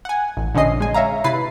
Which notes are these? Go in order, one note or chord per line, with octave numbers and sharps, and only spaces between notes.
F#5 G#5
A1
A#1 D3 C4 C#4 D#5 C7
G#3 G#5
C#5 E5 F5 A#5
C3 E4 B4 B5 A6 C7